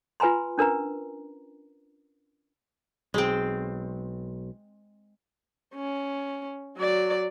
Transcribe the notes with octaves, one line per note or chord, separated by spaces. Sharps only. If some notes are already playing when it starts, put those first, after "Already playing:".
F4 B4 G#5 A#5 C6
C#4 D4 A#4 B4 A#5
B1 G#3 C4
C#4
F#3 D5